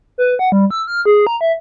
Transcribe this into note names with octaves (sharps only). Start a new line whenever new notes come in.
B4
F#5
G3
E6
F6
G#4
A#5
E5